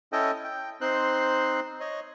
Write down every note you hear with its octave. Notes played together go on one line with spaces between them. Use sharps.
C#4 E4 A4 D#5 G5
G5
C4 D#4 C5 C6 F#6
C#5 D#5